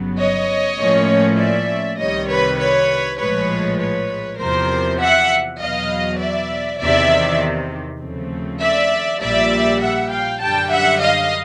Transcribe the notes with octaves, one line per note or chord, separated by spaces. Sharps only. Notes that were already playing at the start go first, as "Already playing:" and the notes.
Already playing: G1 F#2 C#3 F#3 B3
C#5 D#5
A2 F3 A#3 C#4
D5 E5
C2 C3 D#3 G3 C#5 D#5
B4 C#5
B4 C#5
A#1 A2 F3 G#3 B4 C#5
B4 C#5
E2 C3 F3 A#4 C5
E5 F#5
E2 B2 F#3 B3 D#5 F5
D5 E5
E2 C3 D#3 D5 E5
D#2 C#3 F3 A3 C4
D5 E5
A#1 A#2 G3 D5 E5
E5 F#5
F5 G5
F#2 D3 G3 G5 A5
E5 F#5
D#5 F5